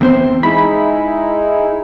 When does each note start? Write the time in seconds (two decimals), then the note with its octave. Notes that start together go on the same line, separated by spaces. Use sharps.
0.01 E2 C4 C5
0.43 G#3 D#4 E4 B5